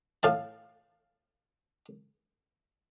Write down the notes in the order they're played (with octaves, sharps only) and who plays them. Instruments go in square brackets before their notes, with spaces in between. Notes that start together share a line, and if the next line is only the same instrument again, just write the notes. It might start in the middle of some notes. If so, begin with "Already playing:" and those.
[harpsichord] A2 F5 A5